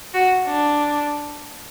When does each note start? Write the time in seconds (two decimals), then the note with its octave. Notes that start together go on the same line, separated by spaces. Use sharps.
0.14 F#4
0.47 D4